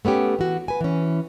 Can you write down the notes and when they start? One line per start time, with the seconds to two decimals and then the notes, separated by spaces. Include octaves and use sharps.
0.05 A3 B3 C#4 G4
0.39 E3 F#4
0.68 B4 G#5
0.81 E3 C#4